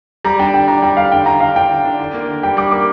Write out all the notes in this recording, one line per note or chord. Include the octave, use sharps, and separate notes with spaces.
G3 A#5
D4 G5
D3 G5
D4 A#5
G3 G5
D3 F5
D3 G5
D3 A#5
D3 F5
D4 G5
D3
D4
D3
A#3
D3
G3 G5
G3 D6
A#3 D6